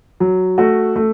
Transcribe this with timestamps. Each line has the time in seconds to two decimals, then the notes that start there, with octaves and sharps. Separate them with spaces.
0.20 F#3
0.58 A3 F#4
0.96 A3